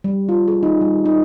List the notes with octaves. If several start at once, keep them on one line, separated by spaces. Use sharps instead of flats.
G3
F4
G#4
D#4
G3
D#4